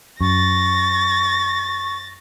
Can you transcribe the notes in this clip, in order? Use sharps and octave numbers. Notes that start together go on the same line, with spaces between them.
F#2 C#6 A6 A#6